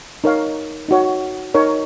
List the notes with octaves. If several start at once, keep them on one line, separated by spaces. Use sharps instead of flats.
D#4 A#4 C#5 F5
D#4 F#4 C#5
D#4 A#4 C#5